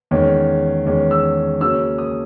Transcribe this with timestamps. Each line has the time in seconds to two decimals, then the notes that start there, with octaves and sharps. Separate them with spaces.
0.11 E2 D#3 G#3 C#4
0.86 E2 D#3 G#3 C#4
1.11 E6
1.61 C#3 F#3 A#3 C#4 E6
1.98 D#6